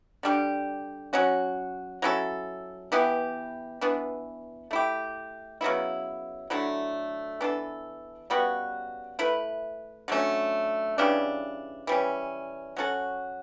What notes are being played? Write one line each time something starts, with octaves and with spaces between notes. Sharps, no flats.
D3 G3 D4 G4
F#3 C#4 F#4
F#3 C#4 E4 A4
E3 B3 E4 G4
E3 B3 D4
A3 E4 G4
C#3 F#3 B3 E4
D3 F#3 A3 E4
E3 B3 D4 A4
C#3 G3 B3 F#4
A3 E4 B4
D3 F#3 A3 C#4
C#3 E3 G3 D4
E3 G3 C#4
F#3 C#4 F#4 A4